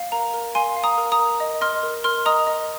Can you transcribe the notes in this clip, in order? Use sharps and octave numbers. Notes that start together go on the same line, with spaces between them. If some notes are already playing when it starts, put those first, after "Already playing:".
Already playing: F5
A#4 A#5
A#4
F5 G#5 C6
F5
A#5 D#6
A#4
A#5 D#6
A#4
D#5
D#5 C6 F6
A#4
A#4 C6 F6
D#5 A#5 D#6
D#5